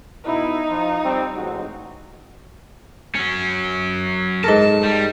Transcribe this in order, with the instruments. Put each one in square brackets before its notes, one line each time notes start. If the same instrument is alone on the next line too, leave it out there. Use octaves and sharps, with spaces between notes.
[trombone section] B2 E4 [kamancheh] D#4
[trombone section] F3 F4
G3 C4
A1 G#2 F#4
[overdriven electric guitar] F#3 C#4
[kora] G#2 A4 A#4 [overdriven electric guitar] A5
[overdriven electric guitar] G3